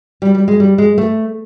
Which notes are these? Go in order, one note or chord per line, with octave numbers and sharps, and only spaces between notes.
G3
G3
G#3
G3
G#3
A3